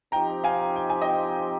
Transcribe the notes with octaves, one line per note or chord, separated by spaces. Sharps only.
F3 C4 D#4 G4 G5 A#5
F5 G#5
G5
G#5
D#5 G5